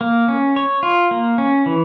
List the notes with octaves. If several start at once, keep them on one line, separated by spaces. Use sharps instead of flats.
A#3
C#4
C#5
F4
A#3
C#4
E3